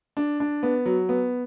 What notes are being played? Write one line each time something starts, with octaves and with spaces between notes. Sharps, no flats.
D4
D4
B3
F#3
B3